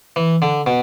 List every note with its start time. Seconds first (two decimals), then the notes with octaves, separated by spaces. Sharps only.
0.16 E3
0.42 D3
0.66 B2